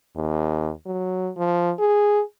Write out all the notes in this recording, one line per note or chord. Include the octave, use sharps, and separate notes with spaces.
D#2
F#3
F3
G#4